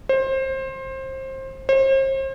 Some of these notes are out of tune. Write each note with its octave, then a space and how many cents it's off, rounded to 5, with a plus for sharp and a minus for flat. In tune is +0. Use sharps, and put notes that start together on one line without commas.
C5 +25
C5 +40